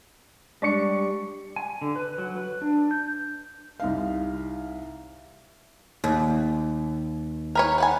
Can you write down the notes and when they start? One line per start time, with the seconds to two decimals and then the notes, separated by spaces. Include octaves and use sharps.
0.62 G3 G#3 D4 C#6 C#7
1.56 G#5
1.82 D3
1.96 B4
2.18 F#3
2.37 B4
2.62 D4
2.91 G6
3.80 C2 D#4 F5
6.04 D#2
7.55 A#4 B4 C#5
7.78 B4 F#5 G#5